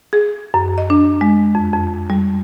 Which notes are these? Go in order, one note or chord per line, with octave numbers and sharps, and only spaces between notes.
G#4
F#2
D#5
D4
G#3
F2
F2
G3